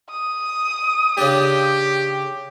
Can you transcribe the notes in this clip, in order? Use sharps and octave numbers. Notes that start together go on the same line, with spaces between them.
D#6
C#3 D4 G4